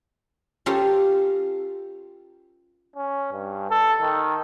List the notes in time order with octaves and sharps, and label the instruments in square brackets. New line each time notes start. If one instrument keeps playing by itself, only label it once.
[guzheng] C#4 F4 G4 A4 A#4 C5
[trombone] C#4
G2
A4
D#3